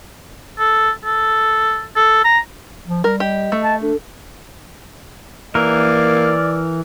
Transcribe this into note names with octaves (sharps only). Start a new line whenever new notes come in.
A4
A4
A4
A#5
F3
G3 A#4
G4 D#5
A3
A5
D4 A4
E3 A#3 A#4 D5